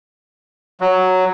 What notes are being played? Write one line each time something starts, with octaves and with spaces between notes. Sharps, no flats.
F#3